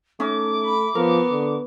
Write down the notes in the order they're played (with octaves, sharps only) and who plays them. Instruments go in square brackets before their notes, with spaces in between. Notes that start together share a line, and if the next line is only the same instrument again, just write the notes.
[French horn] A3 [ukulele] C#4 D#4 [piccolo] D6
[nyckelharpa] B5
[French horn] F3 [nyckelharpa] B3 [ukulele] A#4
[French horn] D3